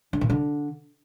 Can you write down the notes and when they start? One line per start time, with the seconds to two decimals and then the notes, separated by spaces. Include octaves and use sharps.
0.13 D3
0.21 A#2
0.30 D3